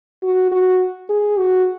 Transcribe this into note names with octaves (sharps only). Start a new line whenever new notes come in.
F#4
F#4
G#4
F#4